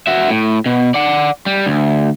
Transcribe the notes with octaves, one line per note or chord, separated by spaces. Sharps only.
F#4 E5
A2
B2
D5 F#5
G3
D2